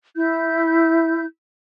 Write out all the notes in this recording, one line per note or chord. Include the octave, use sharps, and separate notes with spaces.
E4 G6